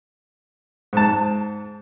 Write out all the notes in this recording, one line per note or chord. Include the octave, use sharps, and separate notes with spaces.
G#2 A5